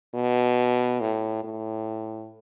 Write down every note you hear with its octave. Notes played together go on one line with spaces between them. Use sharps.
B2
A2
A2